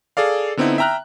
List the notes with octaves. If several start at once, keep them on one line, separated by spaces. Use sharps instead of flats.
G#4 A4 D5 F5
D3 B3 C4 D#4 E4
E5 G5 A#5 F6 F#6